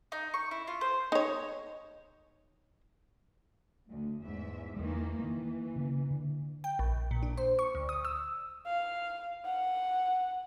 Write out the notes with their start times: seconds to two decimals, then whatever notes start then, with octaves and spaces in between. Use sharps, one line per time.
0.12 D#4
0.34 C#6
0.51 E4
0.67 F4
0.81 C5
1.12 D#4 C#5
3.90 D2
4.22 E2 G#2 E5
4.77 E2 D#3 E3 G#3 A#3
5.19 D#3 E3 A#3
5.76 C#3 A#3
6.11 D3
6.64 G5
6.79 A#1
7.11 A#2
7.23 D4
7.37 C5
7.59 C#6
7.75 D2
7.89 D#6
8.05 E6
8.66 F5
9.45 F#5